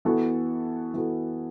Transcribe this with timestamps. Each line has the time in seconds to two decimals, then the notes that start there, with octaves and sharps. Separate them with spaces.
0.05 E3 B3 F#4 A4
0.94 E3 B3 F#4 A4